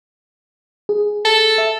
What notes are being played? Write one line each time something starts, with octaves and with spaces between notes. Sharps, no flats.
G#4
A4
E5